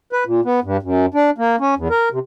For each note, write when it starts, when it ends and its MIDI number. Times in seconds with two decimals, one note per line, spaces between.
0.13 0.24 71
0.26 0.41 46
0.45 0.60 59
0.64 0.77 43
0.83 1.06 42
1.14 1.30 62
1.38 1.56 58
1.60 1.75 61
1.77 1.88 40
1.90 2.09 70
2.12 2.19 48